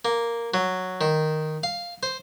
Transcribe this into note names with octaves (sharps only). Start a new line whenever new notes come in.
A#3
F#3
D#3
F5
C5